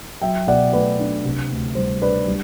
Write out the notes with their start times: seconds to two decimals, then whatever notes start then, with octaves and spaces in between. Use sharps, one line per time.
0.22 F#3 E5 G5
0.47 B2 D5 F#5
0.73 A3 B4 D5
0.99 D4
1.24 C3
1.51 D2
1.75 G3 C5
2.01 D4 B4 D5
2.27 G3